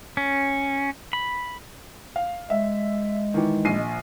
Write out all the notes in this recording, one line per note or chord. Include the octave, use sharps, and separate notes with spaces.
C#4
B5
F5
G#3 E5
D#3 E3
A#1 C7 D#7